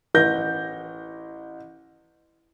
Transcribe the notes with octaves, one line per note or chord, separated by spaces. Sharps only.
A1 G6 A#6